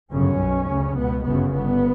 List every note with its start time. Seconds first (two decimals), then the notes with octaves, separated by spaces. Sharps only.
0.12 G1 F#2 C#3 C#4
0.40 B1 B2
0.69 D2 C#3
0.97 C#2 B2 B3
1.25 G1 F#2 C#3 B3
1.54 G1 G2 B3